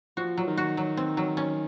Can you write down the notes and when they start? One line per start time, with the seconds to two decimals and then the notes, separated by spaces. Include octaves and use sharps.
0.17 F3 F#4
0.37 F#3
0.47 D#3
0.57 F#4
0.77 F#3
0.97 C4
1.17 F#3
1.37 C#4